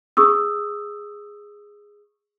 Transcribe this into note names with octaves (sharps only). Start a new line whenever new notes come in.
G#4 C#6 D#6 E6